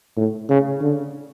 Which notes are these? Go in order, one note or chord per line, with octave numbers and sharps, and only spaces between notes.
A2
C#3
D3